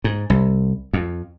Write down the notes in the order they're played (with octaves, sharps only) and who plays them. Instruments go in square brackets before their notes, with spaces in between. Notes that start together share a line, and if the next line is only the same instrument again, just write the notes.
[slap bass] G#2
C2
F2